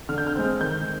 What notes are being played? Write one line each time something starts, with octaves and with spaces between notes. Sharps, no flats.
D3 F6
G6
F6
G#3 C4
D#3 G6